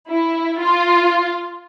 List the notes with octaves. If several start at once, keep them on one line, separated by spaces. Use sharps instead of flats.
E4
F4